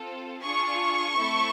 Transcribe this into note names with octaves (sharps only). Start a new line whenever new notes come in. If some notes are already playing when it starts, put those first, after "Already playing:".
Already playing: C4 F4 A4
D4 F4 G#4 C#6
A3 C4 E4 A4